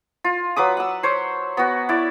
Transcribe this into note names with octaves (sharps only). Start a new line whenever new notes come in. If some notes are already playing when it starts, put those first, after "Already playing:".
F4
F#3 B4 D6 D#6
F#5 E6
C5 C#5
B3 F#4
E4 D5